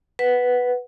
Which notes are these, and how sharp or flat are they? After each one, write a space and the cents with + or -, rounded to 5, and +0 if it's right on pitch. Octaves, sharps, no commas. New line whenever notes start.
B4 +0 F#5 +0